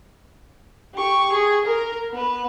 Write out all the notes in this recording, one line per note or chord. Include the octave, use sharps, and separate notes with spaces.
G4 C#6
G#4
A#4
B3 B4